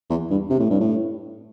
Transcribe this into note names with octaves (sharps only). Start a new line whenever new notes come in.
E2
G2
C3
A2
G2
A2